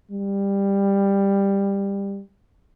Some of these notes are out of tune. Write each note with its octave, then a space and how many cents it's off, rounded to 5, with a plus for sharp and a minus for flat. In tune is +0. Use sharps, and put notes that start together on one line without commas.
G3 +15